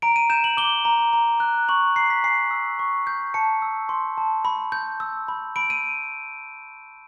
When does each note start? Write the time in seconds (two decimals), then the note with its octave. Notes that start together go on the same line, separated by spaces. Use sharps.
0.02 A#5 D7
0.16 D#7
0.30 G6 E7
0.44 F#7
0.57 D6 G7
0.85 A#5
1.13 A#5
1.40 F#6
1.69 C#6 F#7
1.96 A#5 C7
2.10 B6
2.24 G#5 C7
2.51 E6
2.79 C#6
3.07 G6
3.34 A5 C#7
3.62 E6
3.89 C6
4.18 A5
4.45 B5
4.72 G6
5.00 E6
5.28 B5
5.56 B5 D7
5.70 D#7